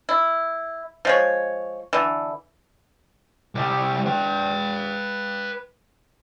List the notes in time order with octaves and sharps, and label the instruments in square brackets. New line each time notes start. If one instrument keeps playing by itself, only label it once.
[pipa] E4
F3 G#3 C#5
D3 E3
[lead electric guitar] C2 G3
B4 G5